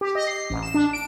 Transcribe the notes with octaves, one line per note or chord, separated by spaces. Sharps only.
G4
D#5
C7
A1
E7
D4
D7